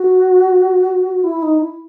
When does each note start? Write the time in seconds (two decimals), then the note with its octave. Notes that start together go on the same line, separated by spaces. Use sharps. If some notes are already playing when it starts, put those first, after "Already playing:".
Already playing: F#4
1.24 E4
1.42 D#4
1.60 E4